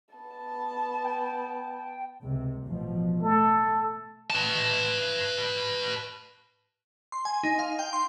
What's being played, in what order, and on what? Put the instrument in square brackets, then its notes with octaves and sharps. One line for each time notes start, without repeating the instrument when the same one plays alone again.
[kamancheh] B3 A5
[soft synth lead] G5
[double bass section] C#2 C3
A1 B2 F3
[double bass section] A3 [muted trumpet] A4
[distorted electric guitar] B4 A5
[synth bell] C6
G#5
D#4
F5
G5
C6